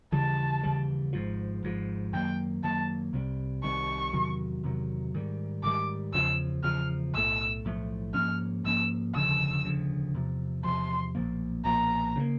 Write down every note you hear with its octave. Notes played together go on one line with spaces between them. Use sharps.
D#2 C#3 E3 G3 A5
D#2 C#3 E3 G3
G#1 G#2 F3
G#1 G#2 F3
F#2 D#3 F#3 A#3 G5
F#2 D#3 F#3 A#3 A5
C2 C3 D#3 G3
C2 C3 D#3 G3 C#6
E2 C3 D#3 F#3
E2 C3 D#3 F#3
G#2 D#3 G3
G#2 D#3 G3 D6
E2 C#3 F3 E6
E2 C#3 F3 F6
B1 A2 F3 A3 E6
B1 A2 F3 A3
G#2 F3 A#3 C#4 F6
G#2 F3 A#3 C#4 E6
E1 D2 C#3 F3 E6
E1 D2 C#3 F3
E2 C3 F3
E2 C3 F3 C6
B1 A#2 F3 A#3
B1 A#2 F3 A#3 A#5
C#3 F#3 A#3